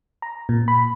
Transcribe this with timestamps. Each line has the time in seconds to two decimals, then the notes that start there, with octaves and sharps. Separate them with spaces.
0.22 A#5
0.49 A#2
0.68 B5